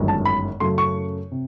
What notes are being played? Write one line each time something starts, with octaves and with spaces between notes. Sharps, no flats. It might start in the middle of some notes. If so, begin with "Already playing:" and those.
Already playing: G1 F#2 D#3 G#3
A5
B5
F#2 C#3 F#3 A3 C6
C#6
C3